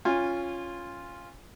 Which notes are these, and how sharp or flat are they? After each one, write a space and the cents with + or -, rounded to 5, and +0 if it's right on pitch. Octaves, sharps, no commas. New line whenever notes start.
C#4 +0 F4 +0 G#5 -25